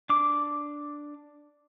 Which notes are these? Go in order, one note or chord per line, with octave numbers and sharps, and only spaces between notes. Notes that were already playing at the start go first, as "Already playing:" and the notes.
D4 D6